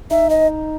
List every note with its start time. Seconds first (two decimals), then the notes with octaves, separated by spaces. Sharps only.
0.11 D#4 E5
0.30 D#5